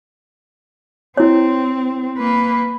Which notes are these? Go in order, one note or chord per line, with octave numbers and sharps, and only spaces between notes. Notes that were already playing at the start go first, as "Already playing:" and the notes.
C4 E4 C#5
A#3 B4